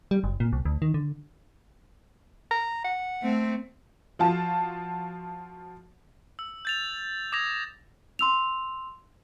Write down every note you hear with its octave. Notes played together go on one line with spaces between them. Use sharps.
G3
F#1
A#2
C2
D2
D#3
D3
A#5
F#5
A3 C4
F3 F4 F#4 A5
E6
G6 A6 F7
D6 D#6 G#6 A#6 F7
C6 E6 F7